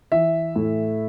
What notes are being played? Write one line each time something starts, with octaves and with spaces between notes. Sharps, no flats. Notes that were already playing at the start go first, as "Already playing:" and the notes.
E3 E5
A2